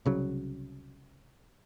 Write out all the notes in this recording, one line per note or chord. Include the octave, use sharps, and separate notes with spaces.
C2 C#3 F#3